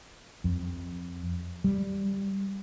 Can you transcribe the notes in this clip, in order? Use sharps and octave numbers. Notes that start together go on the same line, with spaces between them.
F2
G3